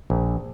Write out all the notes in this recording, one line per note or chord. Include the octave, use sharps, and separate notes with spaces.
A#1